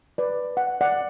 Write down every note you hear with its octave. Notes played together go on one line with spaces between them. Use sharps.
B4 D5
F#5
D5 F#5